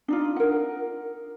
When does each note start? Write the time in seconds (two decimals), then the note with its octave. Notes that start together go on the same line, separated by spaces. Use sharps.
0.08 D4 D#4 F4
0.36 A#4 F#5